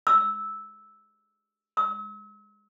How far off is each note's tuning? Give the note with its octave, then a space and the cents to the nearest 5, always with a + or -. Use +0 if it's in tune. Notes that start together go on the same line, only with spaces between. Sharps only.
E6 -10
E6 -40